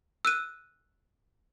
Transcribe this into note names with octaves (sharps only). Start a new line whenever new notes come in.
E6 F#6 D#7